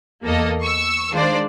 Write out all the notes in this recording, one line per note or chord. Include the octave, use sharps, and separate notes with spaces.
E2 A#3 A4 D#5
C#6 E6
D#3 G#3 D4 F4 C5 D5